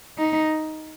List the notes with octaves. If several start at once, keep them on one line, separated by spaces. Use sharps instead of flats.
D#4